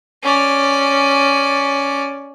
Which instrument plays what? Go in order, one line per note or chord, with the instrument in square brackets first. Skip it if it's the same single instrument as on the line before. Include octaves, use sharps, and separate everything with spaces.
[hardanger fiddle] C#4 D5